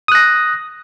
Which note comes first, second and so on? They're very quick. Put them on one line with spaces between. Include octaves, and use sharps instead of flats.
D#6 F#6 A#6